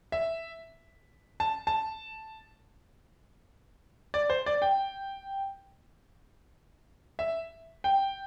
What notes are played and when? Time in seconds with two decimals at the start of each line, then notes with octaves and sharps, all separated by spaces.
0.12 E5
1.40 A5
1.67 A5
4.14 D5
4.30 C5
4.46 D5
4.62 G5
7.19 E5
7.84 G5